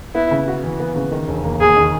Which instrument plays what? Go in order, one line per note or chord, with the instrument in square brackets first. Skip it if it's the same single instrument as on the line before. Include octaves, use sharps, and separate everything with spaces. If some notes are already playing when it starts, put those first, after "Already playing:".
[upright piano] B3 [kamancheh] E4
[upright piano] C#3
F#4
E3
B3
C#3
D#3
E1
A#3
[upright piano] D#2 [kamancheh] G#4
[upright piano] D#3